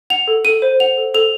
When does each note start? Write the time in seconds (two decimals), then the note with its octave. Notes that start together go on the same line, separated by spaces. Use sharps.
0.10 F#5 F7
0.28 A4
0.45 A4 D#7
0.62 C5
0.80 F#5 F7
0.97 A4
1.14 A4 F7